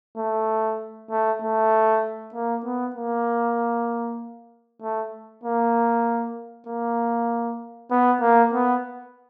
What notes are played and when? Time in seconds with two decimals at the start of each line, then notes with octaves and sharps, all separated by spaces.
0.18 A3
1.10 A3
1.42 A3
2.34 A#3
2.65 B3
2.96 A#3
4.82 A3
5.43 A#3
6.67 A#3
7.91 B3
8.21 A#3
8.53 B3